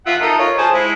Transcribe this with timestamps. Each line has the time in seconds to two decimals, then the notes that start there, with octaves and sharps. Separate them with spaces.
0.07 F4 E5 F#5
0.22 D#4 A4 A#4
0.39 F4 C#5
0.58 G#4 C5 A5
0.74 G#3 E4